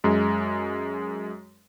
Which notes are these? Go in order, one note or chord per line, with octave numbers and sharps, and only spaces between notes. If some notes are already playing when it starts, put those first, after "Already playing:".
F#2 G#3